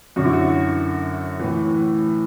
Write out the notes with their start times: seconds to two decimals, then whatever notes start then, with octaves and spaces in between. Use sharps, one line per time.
0.16 F#2 D3 F#4
0.25 E4
0.33 F#4
1.40 A2 E3